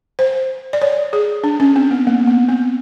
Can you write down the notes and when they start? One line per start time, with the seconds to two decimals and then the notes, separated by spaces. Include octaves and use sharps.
0.19 C5
0.73 D5
0.82 C#5
1.13 G#4
1.44 D4
1.60 C#4
1.76 C4
1.91 B3
2.07 A#3
2.27 B3
2.49 C4